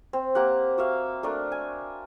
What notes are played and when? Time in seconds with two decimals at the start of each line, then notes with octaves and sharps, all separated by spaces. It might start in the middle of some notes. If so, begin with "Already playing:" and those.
0.13 C4
0.35 A#3 G4 F#5
0.78 F#4 E5 F5
1.23 A3 D4 A#4
1.52 G#5